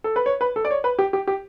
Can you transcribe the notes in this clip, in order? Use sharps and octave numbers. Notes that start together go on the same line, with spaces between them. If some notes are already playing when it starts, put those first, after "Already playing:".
A4
B4
C#5
B4
A4
D5
C#5
B4
G4
G4
G4